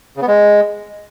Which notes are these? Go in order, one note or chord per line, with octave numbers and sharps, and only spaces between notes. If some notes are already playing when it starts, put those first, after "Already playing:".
C#3
B3
G#3